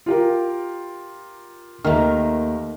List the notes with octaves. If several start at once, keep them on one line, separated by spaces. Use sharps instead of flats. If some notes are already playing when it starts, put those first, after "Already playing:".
F4 G4 A#4
D#2 D#3 A3 A#5 F6